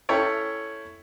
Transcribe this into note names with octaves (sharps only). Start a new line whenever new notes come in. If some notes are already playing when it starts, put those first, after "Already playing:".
C#4 E4 A4 C#5 G5